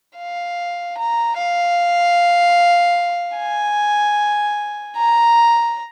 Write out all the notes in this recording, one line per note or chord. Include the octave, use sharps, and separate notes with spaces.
F5
A#5
F5
G#5
A#5